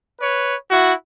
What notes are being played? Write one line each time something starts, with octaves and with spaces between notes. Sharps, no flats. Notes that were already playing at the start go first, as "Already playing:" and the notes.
B4 C#5
E4 F#4